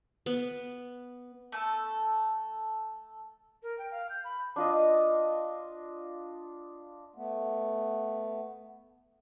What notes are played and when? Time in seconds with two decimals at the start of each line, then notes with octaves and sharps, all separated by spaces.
0.26 B3
1.52 A3 A4
3.63 A#4
3.78 G5
3.91 F5
4.09 G6
4.24 B5
4.56 D4 F4 D#5
7.15 A3 B3